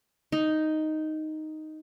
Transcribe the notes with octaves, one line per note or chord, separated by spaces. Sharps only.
D#4